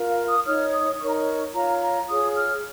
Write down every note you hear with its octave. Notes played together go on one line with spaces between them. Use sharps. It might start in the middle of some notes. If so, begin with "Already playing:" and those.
Already playing: F4 A#4
F5
D#6
D#4 C#5 F6
D#6
D#4 A#4 C#5 C#6
A#5
C#6
F4 C#5 A#5
A#5
F4 G#4 C#5 D#6
F6